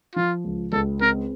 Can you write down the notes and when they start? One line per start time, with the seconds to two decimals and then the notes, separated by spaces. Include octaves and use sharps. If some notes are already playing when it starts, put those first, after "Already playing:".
0.15 F3 F4
0.45 C#2
0.72 C#2 A4
1.01 C4 A#4